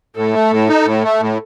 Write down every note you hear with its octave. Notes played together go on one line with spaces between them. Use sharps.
A2 A4
A3
A2
D#4
A2
A3
A2